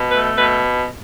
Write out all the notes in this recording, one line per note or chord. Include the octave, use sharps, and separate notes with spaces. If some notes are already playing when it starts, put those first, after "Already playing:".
Already playing: B2
A3 B4
B2 B4